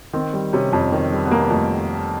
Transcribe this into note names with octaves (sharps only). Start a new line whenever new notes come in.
D#3 C4
G3
C3 C#4
F2
D#3
G3
B3
C3 A#3
F2 A3